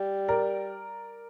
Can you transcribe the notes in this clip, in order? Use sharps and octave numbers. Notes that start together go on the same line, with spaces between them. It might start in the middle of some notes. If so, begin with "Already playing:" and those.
Already playing: G3
A#4 D5